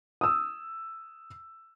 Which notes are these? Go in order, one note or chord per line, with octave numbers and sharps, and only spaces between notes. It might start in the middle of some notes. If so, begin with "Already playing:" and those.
D#6 E6